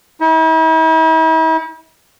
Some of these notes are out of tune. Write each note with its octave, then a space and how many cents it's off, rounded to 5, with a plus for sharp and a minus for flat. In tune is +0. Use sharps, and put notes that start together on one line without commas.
E4 -45